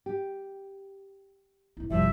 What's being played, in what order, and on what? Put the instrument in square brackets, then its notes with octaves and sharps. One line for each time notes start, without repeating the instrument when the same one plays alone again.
[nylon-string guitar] G4
[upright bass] G1 E4
[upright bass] F#1 C2 [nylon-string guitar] F3 G3 [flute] E5